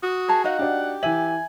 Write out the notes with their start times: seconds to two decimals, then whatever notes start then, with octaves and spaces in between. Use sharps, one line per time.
0.03 F#4 D#6
0.28 G#4 A#4 A5 A#5
0.44 D#4 D#5 F5 F#5
0.59 D4 F#4 G4 D5
1.03 E3 E5 G#5 D#7 F#7